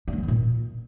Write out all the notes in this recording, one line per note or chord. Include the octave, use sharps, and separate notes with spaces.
D4
A3
E3
B3
A#2